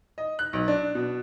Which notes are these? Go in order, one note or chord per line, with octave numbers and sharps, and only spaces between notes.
D#5
F#6
B1
D4
B2